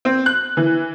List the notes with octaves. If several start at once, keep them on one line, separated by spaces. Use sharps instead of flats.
C4
F#6
E3